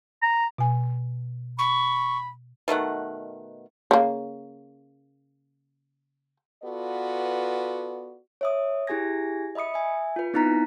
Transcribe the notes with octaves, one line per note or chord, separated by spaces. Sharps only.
A#5
B2 G#5
B5 C#6
B2 D#3 A3 F#5
C#3 A#3
B3 F4 F#4 A4 B4 D5
C#5 E5 D#6
E4 G4 G#4 G#5 G#6 A#6
D#5 E5 B5 D#6 C#7
E5 G#5
F4 B4
B3 C4 D#4 E4 A#5 B6